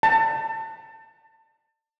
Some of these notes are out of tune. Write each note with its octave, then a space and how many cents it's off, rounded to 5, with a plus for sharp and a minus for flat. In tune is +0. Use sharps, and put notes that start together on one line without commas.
A5 +25